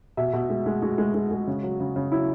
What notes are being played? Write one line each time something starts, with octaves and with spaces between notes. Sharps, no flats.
B2 E5
B2
G#3
G#3
G#3 F#4
G#3
G#3
G#3
C#3
F#3
C#3
C#3
F#3 E4